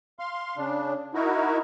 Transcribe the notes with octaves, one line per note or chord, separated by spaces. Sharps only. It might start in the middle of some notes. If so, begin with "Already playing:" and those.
F5 C6
C#3 D4
D#4 E4 F#4 A#4